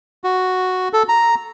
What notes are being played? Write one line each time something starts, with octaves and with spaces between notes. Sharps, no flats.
F#4
A4
A#5